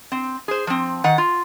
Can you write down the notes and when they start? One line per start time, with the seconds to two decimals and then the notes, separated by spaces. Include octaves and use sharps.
0.12 C4
0.48 G#4 C5
0.67 F3 C4
1.04 D#3 F#5
1.18 F4